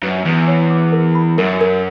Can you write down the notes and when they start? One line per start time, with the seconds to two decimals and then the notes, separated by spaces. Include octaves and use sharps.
0.03 F#2 B4
0.25 E2 B4
0.48 C#5
0.70 D6
0.92 A#4
1.15 B5
1.38 F#2 A#4
1.61 A#4